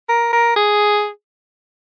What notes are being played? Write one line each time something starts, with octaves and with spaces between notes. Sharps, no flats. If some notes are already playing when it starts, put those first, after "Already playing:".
A#4
A#4
G#4